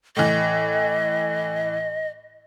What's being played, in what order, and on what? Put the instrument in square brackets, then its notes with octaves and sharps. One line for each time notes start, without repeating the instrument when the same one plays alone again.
[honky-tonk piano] A2 E3 [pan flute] D#5